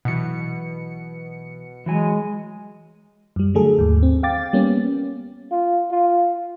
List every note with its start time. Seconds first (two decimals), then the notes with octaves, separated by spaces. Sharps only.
0.05 B1 B2 E3 F#3 C#7
1.86 E3 F#3 G#3 G#5
3.36 F#2 G3
3.54 D3 F#3 A3 G#4 A4
3.78 D#2 G#2
4.03 C4
4.23 F5 G5 D6 A6
4.53 G3 A#3 B3 C#4
5.51 F4
5.91 F4